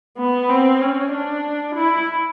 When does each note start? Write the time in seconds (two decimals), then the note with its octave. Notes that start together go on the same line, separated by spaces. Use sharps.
0.18 B3
0.49 C4
0.81 C#4
1.12 D4
1.75 E4